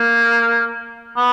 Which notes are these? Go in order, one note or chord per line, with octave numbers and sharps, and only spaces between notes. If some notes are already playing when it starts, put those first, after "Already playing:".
Already playing: A#3
B3